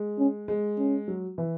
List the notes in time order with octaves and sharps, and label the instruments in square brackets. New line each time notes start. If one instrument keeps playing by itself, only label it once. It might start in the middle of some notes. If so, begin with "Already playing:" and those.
Already playing: [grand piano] G#3
[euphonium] C#4
[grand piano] G#3
[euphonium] C#4
[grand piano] F#3
E3